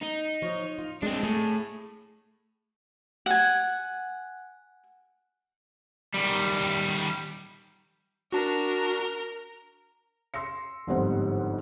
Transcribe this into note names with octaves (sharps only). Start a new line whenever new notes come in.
D#4
F3 C#5
F4
G#3 C4 D4
A2 G#4
F#5 G#5
D#3 G3
D4 F#4 A#4
C6 E6 A#6 C#7
G1 F2 G#2 G3 C5 F#5